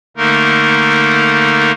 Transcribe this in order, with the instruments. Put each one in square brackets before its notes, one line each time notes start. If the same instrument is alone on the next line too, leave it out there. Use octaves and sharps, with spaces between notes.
[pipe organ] D3 A3 A#3 D#4 A#4